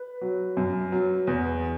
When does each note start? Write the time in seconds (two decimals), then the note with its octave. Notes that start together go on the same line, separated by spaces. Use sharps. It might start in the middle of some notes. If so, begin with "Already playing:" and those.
Already playing: B4
0.21 F#3
0.57 F#2
0.92 F#3
1.27 E2